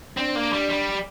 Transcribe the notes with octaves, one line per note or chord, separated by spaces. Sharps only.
C4 D4
A#3
G3
G3